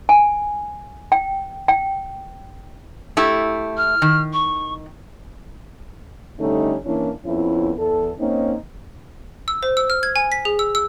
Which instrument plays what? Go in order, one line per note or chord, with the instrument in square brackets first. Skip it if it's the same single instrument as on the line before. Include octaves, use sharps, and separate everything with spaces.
[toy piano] G#5
G5
G5
[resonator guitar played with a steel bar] A3 E4 G4
[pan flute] F6
[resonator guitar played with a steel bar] D#3
[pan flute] C#6
[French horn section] D3 G3 A3 C#4 D#4
E3 A#3 C#4 D4 E4
F2 B3 C#4 E4
E2 A4
A#3 C4 C#4 D#4
[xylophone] E6
C5
E6
F6
G#6
G#5
B6
G#4
E6
E6